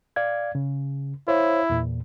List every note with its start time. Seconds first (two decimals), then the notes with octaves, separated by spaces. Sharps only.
0.16 D5 F5 G#6
0.55 C#3
1.28 E4 C5 C#5 F5
1.70 E2 A#2